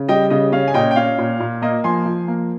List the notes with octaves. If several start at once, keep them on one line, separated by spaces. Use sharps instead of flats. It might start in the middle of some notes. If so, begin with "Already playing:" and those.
Already playing: C#3
G3 D#5 G5
C#3 D#5
C#4 F5
G#5
A#2 D#5 G5
G5
C#4 F5
A#2
A#2
A#3 D#5
F3 G#5 C6
F3
A#3